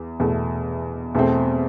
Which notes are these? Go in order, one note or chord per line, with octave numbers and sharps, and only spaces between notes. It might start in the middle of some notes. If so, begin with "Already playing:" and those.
Already playing: E2
E2 B2 A3
E2 B2 A3 C4